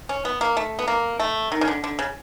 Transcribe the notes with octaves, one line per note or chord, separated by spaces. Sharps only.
C#4
B3
A#3
A3
B3
A#3
A3
D#3
C#3
D3
D3
C#3